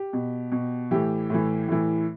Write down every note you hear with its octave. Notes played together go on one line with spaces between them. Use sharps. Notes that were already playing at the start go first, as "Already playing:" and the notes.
Already playing: G4
B2
B2
A2 E3 G4
A2 E3
A2 E3